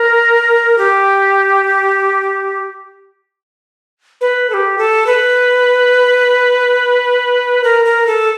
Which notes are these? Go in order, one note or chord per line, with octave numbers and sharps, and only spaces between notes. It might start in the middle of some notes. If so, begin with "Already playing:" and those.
Already playing: A#4
G4
B4
A4
G4
A4
B4
A#4
A#4
A4